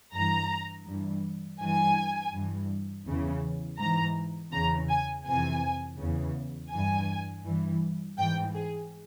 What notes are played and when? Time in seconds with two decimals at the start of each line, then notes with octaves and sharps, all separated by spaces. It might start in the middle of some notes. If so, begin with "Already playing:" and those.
0.13 G2 E3 A#5
0.86 G2 E3
1.60 G2 E3 G#5
2.33 G2 E3
3.06 E2 C#3 E3
3.79 G#2 E3 A#5
4.52 E2 C#3 E3 A#5
4.89 G#5
5.25 F2 C3 E3 G#5
5.99 E2 C#3 E3
6.72 G2 E3 G#5
7.44 G2 E3
8.18 G#2 E3 G5
8.54 G#4